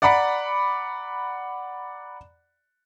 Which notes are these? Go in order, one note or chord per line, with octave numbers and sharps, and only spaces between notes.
D5 F#5 A#5 B5 D6 B6